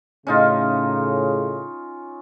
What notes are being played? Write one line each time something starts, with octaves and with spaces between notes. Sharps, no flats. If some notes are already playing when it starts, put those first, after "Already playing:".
A2 C#3 C#4 D#4 F4